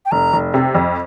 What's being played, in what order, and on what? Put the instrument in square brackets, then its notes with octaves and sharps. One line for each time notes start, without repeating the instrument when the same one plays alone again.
[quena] G5
[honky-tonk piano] F1 [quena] A#5
[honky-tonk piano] F1
C3
F2